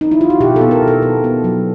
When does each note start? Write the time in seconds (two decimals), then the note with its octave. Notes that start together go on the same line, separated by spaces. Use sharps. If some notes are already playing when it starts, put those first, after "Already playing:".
0.01 D#4
0.11 E4
0.21 F4
0.30 F#4
0.40 B2 G4
0.56 A4
0.61 B3
0.71 A#4
0.82 B2
0.88 A4
1.02 B3
1.24 B3
1.44 F#3